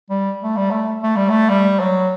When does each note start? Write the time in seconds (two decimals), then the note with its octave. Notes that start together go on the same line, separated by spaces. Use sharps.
0.10 G3
0.43 A3
0.57 G3
0.71 A3
1.03 A3
1.16 G3
1.30 A3
1.49 G3
1.79 F#3